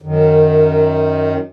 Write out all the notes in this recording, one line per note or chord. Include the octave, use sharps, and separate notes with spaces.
F#2 D#3